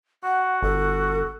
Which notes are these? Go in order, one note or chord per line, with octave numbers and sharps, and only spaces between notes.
F#4 F#5
G1 A4